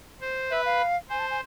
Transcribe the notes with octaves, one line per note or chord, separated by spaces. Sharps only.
C5
B4 E5
F5
C5 G#5
A5
G#5